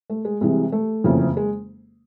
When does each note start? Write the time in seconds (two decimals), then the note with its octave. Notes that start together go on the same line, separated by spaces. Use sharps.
0.10 A3
0.25 G#3
0.41 C2 C3 E3 G#3
0.72 A3
1.04 F#1 F2 C#3 E3
1.37 G#3